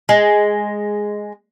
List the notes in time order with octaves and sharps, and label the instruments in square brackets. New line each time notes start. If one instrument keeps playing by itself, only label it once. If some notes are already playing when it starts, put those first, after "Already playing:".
[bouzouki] G#3